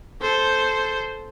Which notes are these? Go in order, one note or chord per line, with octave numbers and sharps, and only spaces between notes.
A4 C5